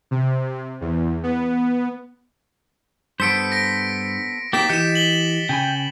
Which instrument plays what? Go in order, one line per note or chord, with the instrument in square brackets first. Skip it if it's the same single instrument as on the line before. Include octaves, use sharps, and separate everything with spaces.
[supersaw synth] C3
E2
B3
[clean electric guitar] G2 [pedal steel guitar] B3 A4 C5 [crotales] B6 C#7 D7
[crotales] A#6 D7
[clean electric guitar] A#3 C4 D#4 [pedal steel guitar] G4 [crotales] A6 B6 E7
[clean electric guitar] E3 [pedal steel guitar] G4 D#5 G6 [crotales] C#7 E7
[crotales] F#7 G7
[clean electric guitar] C#3 G#5 B5 [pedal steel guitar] G5